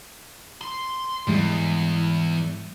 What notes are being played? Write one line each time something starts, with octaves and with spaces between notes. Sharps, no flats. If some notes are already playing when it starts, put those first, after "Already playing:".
C6
E2 G#2 G3 G#3